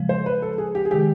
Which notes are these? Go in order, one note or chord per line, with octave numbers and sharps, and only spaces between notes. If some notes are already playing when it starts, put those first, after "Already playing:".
Already playing: C#3 F3 G#3
C5
B4
A4
G#4
G4
G#4
C3 D#3 G#3 G4